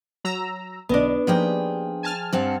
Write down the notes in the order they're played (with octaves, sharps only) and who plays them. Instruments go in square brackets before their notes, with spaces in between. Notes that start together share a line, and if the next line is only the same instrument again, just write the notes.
[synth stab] F#3 A#5 E6
[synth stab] B1 D3 D#5 [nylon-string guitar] B3 D4
[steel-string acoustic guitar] F3 G#4 G5 [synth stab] A#3 D#4 G4
[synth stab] G#5 A5 F6
[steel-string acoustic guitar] G2 C4 F#5